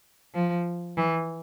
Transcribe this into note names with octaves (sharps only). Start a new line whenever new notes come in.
F3
E3